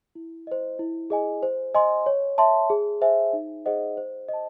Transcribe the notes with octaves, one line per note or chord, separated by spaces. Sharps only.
E4
C5 D#5
E4
G#4 D#5 G#5
C5
D#5 G#5 C6
C#5
E5 A5 C6
G#4
C5 E5 G#5
D#4
G#4 C5 D#5 F#5
C5
D#5 A5